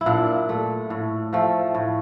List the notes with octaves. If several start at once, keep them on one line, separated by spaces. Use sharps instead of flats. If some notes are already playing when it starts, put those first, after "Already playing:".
E4
A#2 D4
A3
A2
F3 A3
A2